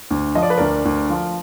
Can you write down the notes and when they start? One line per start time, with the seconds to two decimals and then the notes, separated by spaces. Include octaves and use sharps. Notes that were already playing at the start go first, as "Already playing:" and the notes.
0.11 D2
0.35 F3 D#5
0.43 D5
0.50 B4
0.58 D2 A#4 D5
0.85 D2
1.10 F3